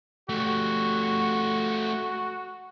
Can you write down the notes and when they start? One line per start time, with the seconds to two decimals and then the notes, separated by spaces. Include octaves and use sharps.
0.29 A3 F#4 G4